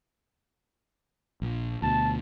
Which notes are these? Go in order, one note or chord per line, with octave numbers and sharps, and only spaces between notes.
A#1
D2 B2 A5